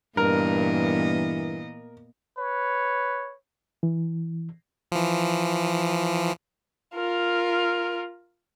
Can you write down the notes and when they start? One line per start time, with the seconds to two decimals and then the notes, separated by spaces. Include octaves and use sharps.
0.17 G2 A#2 E3 B3 A#4 D#5
2.39 B4 C#5
3.83 E3
4.92 E3 F3
6.95 F4 A#4